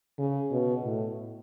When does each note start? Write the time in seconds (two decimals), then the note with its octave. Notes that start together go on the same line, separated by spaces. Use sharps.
0.19 C#3
0.51 B2
0.84 A2